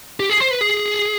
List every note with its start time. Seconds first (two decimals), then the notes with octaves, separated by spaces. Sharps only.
0.20 G4
0.30 G#4
0.40 C5
0.51 B4
0.61 G#4